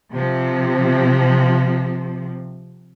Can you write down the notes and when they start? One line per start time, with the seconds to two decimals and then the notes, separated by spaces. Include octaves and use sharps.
0.13 C3 F3